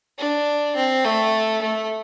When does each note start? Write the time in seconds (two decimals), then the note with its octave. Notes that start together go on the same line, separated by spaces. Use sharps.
0.19 D4
0.76 C4
1.04 A3
1.62 A3